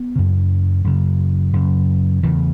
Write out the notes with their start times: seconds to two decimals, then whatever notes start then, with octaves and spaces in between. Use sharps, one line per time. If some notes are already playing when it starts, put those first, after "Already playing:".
Already playing: B3
0.16 F#2 C#3
0.84 F#2 C#3
1.53 F#2 C#3
2.23 E2 C#3 E3